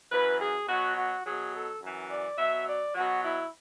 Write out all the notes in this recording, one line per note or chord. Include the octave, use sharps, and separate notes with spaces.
F#2 E3 B4
G#4
B2 F#3 F#4
F#4
B2 F#3 G#4
A4
F#2 E3
D5
B2 F#3 E5
D5
B2 F#3 F#4
E4